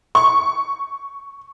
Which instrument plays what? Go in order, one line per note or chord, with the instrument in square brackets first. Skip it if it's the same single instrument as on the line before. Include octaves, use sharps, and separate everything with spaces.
[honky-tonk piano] C#6